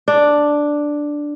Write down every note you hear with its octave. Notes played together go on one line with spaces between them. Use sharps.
D4